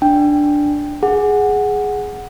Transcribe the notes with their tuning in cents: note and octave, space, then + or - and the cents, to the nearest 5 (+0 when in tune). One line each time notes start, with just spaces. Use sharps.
D4 +0 G5 +0
G#4 +0 F#5 +0